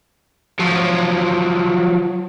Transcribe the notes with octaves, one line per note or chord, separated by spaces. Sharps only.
F3 F#3